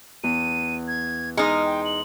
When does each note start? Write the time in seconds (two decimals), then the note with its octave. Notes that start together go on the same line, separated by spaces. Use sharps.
0.24 E2 D#7
0.88 G#6
1.37 G#3 D#4 A#5 C6 F6
1.65 G5
1.85 F#7